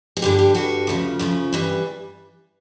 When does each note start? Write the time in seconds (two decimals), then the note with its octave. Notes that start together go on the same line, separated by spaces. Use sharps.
0.17 G#4
0.22 G2 D3 G3 G4
0.39 G4
0.55 G2 D3 G3 F#4
0.87 D2 C#3 F3
1.19 D2 C#3 F3
1.52 G2 E3 G3